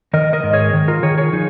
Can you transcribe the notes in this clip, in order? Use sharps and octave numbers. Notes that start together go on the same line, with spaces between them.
D#3 A#4 D#5
A#4 D#5
G#2
G#4 C#5
D#3
F4 A#4
D#3 G#4 C#5
G#4 C#5
F3 D#4 G#4